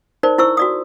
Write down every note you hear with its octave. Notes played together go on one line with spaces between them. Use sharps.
D#4 A#4 C5 D5
E4 C5 C#6 E6
F#4 D5 D#6